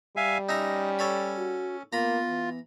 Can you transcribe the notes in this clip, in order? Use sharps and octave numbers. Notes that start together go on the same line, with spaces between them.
G3 E5 F5 G#5
C#4 D#4 E5 A#5
A4 C#5 B5
F#4
A#3 B3 F4 A#5 B5
E3